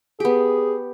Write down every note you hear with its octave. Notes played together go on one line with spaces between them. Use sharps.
B3 G4 G#4